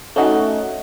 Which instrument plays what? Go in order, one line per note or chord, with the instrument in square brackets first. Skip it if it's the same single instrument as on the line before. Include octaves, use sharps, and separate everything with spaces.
[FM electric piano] A3 C#4 D#4 F#4